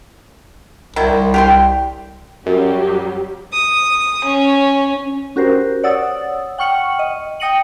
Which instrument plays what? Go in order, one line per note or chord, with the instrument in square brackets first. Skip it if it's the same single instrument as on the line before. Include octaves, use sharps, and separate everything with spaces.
[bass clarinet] C2 [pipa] D#3 F#3 E4
[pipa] G4 G5 C6
[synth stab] F#2 [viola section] F#3 G3 G4
[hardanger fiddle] D#6
C#4
[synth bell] C#4 F#4 G4 A#4 C5
C#5 D5 F#5 D#6 E6 A6
F#5 G5 C#6 F6 C#7 F#7
D#5
G5 D#6 A#6 C#7 D#7 F#7